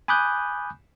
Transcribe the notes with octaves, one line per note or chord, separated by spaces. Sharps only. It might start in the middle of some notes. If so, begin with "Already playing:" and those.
G#5 B5 D6 D#6 F#6 G6